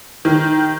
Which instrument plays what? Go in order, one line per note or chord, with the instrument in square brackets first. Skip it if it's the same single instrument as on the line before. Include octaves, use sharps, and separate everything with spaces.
[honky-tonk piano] D#3